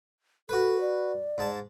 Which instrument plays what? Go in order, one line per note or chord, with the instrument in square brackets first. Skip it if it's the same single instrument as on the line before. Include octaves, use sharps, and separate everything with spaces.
[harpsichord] F#4 B4 [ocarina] A4
[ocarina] D5
[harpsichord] G#2 A5